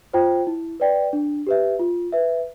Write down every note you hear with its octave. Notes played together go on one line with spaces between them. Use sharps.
F4 C5 G5
E4
B4 D5 G5
D4
G4 B4 E5
F4
B4 E5